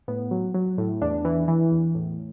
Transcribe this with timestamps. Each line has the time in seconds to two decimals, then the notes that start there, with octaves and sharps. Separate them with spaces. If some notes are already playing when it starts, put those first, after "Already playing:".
0.08 A2 B3
0.31 F#3
0.54 F#3
0.78 A2
1.02 E2 D4
1.25 E3
1.48 E3
1.71 E2
1.95 A2